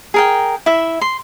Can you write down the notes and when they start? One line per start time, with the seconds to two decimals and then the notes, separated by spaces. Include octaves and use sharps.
0.14 G#4 A#4 G5
0.66 E4 E5
1.01 C6